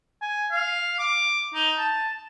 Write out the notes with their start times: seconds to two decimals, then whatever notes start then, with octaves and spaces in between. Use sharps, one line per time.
0.22 G#5
0.51 F5
0.99 D6
1.54 D#4
1.78 A5